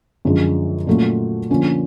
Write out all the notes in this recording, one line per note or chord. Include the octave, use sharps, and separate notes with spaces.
F#2 D3 F3 G#3
A#2 F#3 A3 C#4 F4
D3 F3 A#3 C#4